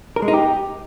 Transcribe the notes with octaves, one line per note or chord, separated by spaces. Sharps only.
A#4
G#3
D#4
G4